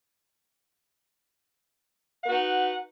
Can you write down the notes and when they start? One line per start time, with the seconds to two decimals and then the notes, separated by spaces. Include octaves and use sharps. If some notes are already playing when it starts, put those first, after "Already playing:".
2.22 F#5
2.26 B4
2.29 F#4
2.32 D#4